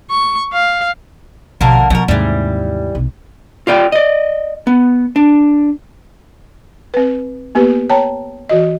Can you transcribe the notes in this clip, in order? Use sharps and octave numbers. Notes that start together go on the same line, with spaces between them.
C#6
F5
A#1 B2 D3 A#3 A#4
B2 F3 A3 A#4
D#2 G#2 C3 E3 G3 A3 A#3
B1 C3
F4 G4 D5 G5
D5 D#5
B3
D4
C4 B4
A#3 B3 G4 B4
C#5 G5 A5 A#5
E3 F#4 D#5